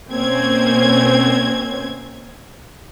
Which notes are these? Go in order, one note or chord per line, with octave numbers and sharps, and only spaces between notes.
B2 A#3 C4 C#4 G#6